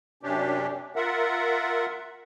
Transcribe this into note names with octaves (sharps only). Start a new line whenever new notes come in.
F#2 C3 C#4 D4 G4
F4 A#4 E5 F#5